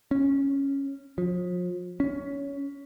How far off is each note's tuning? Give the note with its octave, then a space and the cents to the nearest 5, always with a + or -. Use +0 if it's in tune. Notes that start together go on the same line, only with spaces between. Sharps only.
C#4 -5
F3 +40
C#4 +20